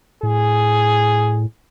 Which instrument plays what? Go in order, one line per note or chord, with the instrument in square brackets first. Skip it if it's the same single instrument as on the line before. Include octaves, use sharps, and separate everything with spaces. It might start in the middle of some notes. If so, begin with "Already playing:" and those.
[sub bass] A2 [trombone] G#4